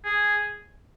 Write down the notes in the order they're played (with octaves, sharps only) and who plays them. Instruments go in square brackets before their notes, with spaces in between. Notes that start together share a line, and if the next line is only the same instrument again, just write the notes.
[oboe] G#4